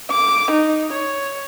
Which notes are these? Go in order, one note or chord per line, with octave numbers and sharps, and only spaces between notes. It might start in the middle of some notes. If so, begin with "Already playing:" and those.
D6
D#4
C#5